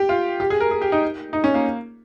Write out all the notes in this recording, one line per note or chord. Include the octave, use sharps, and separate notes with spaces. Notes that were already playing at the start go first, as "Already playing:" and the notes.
Already playing: G4
F4
G4
G#4
A#4
G#4
G4
D#4
D#4
C#4
A#3